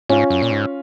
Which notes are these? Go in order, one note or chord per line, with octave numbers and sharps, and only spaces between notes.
G#2 C#4 F4
F#2
A#2
G#2